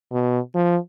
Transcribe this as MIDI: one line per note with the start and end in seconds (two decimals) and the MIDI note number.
0.13 0.39 47
0.55 0.76 53